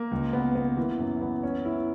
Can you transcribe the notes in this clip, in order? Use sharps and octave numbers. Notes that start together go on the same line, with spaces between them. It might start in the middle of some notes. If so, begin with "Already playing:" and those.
Already playing: A#3
C#2
B3
B3
E3
F#2
B3
C#4
E4